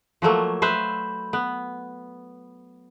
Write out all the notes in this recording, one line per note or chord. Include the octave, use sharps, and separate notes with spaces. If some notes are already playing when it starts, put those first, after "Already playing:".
F3 F#3 A3 A#3
B4 C5 E5
B3